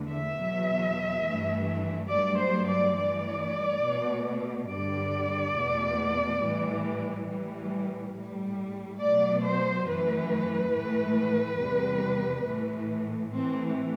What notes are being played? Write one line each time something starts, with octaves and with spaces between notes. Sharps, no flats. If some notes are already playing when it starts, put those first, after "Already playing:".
Already playing: E2 D3 A3
E5
E2 B2 F#3
G2 E3 A3
G2 F#3 A3 D5
C5
D5
G2 E3 A3 D5
B2 A3
G2 D3 G3 D5
E2 B2 A3
A2 E3 G3
A2 E3 G3
A2 G3
B2 F#3 A3 D5
C5
F#2 E3 A3 B4
A2 E3 A3
E2 C3 G3
A2 E3 A3
A2 E3 A3 C4